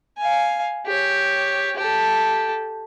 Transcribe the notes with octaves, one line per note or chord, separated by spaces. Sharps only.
F5 G#5
G4 C#5
G4 A4